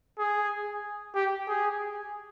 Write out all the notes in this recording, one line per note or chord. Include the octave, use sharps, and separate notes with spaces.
G#4
G4
G#4